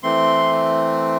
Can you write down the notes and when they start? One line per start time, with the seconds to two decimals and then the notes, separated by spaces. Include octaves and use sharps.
0.03 E3 A3 C4 C6